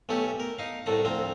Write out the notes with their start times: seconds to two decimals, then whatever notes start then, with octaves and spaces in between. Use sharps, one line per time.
0.09 B1 A3 C#4 G4
0.40 A#4
0.58 D#4 F5
0.86 C2 A2 A3 A#5
1.05 D2 F3 C4 A#5